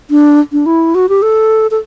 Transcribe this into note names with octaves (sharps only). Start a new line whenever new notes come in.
D4
D4
E4
F#4
G4
A4
A4